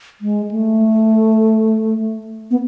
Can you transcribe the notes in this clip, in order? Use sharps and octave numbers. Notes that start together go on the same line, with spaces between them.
G#3
A3
B3